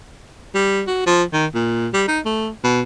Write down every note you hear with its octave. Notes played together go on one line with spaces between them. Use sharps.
G3
F#4
F3
D#3
A#2
G3
D#4
A3
B2